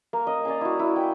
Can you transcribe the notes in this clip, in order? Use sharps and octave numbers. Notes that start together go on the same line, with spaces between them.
A#3
D#5
D5 D#5 F5 G#5
E4 F#4
E4
G5